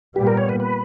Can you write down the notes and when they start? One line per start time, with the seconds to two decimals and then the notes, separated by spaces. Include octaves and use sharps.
0.16 A#2 G3 B3 G4
0.27 A#4
0.37 C#5
0.49 B4
0.60 B4